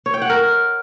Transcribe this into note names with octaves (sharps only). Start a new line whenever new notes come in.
C#5
G5
F#5
A#4